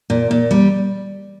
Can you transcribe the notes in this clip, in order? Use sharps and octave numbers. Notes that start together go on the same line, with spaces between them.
A#2
A#2
G3